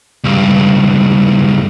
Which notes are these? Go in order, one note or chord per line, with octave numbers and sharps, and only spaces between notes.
C#2 G2